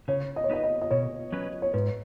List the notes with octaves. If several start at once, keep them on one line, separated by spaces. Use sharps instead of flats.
C#3 C#5
D#5
C#5
B3 D#4 B4 D#5
D#5
D#5
B2 C#5
F#3 C#4 B4
C#5
G#2 B4